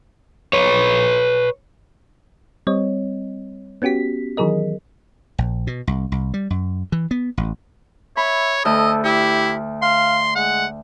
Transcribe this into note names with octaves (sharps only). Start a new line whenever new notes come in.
B4 C#5
G3 C4 C#5 D#5
B3 C#4 F#4 G4 B6
D#3 E3 F#3 G#4 A#4 D#5
A#1
B2
C2
C2
G3
F#2
E3
B3
A1
C#5 E5 B5
D2 A4 D#5 E6
E4 G4
F5 C6
G#3 F#5